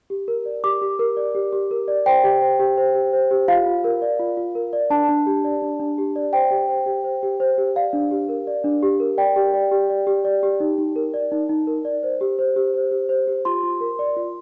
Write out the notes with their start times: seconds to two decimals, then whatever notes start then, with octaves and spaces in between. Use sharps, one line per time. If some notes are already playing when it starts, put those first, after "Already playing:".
0.10 G4
0.28 A#4
0.46 D5
0.64 G4 D6
0.82 G4
0.99 A#4
1.17 D5
1.35 G4
1.53 G4
1.71 A#4
1.88 D5
2.06 C5 G5
2.24 G4
2.42 C5
2.59 G4
2.77 C5
2.95 G4
3.13 C5
3.31 G4
3.48 F4 F5
3.66 F4
3.84 A#4
4.02 D5
4.19 F4
4.37 F4
4.55 A#4
4.73 D5
4.90 D4 A5
5.09 D4
5.26 G4
5.44 D5
5.62 D4
5.80 D4
5.98 G4
6.16 D5
6.33 C5 G5
6.51 G4
6.69 C5
6.86 G4
7.04 C5
7.23 G4
7.40 C5
7.58 G4
7.76 D5 F5
7.93 D4
8.11 G4
8.29 A#4
8.47 D5
8.64 D4
8.83 G4
9.00 A#4
9.18 D5 G5
9.36 G4
9.54 D5
9.71 G4
9.90 D5
10.07 G4
10.25 D5
10.43 G4
10.60 D#4
10.78 D#4
10.96 A#4
11.14 D5
11.32 D#4
11.49 D#4
11.67 A#4
11.85 D5
12.03 C5
12.21 G4
12.39 C5
12.56 G4
12.74 C5
12.91 G4
13.09 C5
13.27 G4
13.45 F4 C6
13.63 F4
13.81 A#4
13.99 D5
14.16 F4